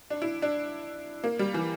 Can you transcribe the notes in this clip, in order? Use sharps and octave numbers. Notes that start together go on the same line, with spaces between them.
D4
E4
D4
A#3
G3
E3